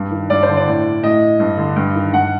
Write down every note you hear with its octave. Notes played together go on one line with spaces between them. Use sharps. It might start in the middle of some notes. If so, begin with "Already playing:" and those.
Already playing: G2
D#3
G2 D5
C5
D3
D5
A2
A2 D#5
G2
D3
G2
D#3
G2 F#5